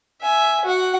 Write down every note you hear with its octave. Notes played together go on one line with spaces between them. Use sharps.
E5 G#5
F#4 F#5